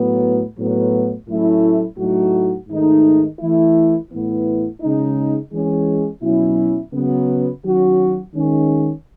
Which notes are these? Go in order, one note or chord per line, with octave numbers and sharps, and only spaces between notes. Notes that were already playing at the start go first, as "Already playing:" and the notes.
Already playing: A2 F#3 B3
A2 F#3 B3
A2 F#3 A3 C#4 E4
A2 F#3 A3 D#4 F#4
G#2 D#3 A3 D#4
E3 A3 E4
A2 E3 B3 E4
C#3 G#3 D#4
E3 G#3 C#4
B2 F#3 C#4 E4
C#3 F#3 B3
D#3 F#3 C#4 F#4
D#3 G#3 C#4